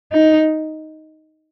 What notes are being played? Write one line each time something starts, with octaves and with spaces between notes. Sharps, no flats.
D#4